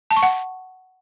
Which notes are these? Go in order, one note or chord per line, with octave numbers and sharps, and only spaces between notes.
A5
C#6
F#5